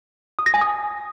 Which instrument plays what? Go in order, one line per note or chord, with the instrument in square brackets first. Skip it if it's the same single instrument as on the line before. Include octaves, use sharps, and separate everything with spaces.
[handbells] D#6
A#6
G#5
D#6